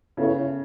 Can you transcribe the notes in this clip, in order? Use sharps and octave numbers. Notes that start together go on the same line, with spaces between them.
C#3 B3 E4 A4 C#5